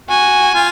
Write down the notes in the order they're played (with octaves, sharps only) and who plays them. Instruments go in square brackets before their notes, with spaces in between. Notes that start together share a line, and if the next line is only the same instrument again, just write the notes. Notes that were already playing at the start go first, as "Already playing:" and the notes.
[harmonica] F#4 [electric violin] G#5
[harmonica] F4